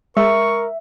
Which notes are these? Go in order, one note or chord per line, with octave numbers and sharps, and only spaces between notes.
G#3 A#4 E5 C#6